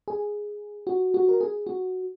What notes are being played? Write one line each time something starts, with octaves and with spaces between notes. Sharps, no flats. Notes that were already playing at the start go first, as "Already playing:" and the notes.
G#4
F#4
F#4
A#4
G#4
F#4